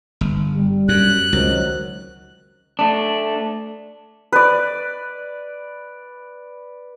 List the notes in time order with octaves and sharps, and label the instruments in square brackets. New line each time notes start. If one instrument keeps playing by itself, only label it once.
[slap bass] G1
[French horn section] G3
[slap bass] F#2 [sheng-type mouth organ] F#6
[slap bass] C#2 [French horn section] D#3 F#3 C4
[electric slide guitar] A3 D4
[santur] B4 D5